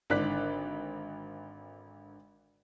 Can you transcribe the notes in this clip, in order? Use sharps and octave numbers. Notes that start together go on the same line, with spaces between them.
G#1 D3 D5 F#6 B6